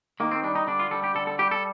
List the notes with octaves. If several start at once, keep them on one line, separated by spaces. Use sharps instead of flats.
D#3 A#3
C4
G3 D4
D#4
D3 D4
F4
G3 A4
G4
D3 A4
A4
G3 G4
A4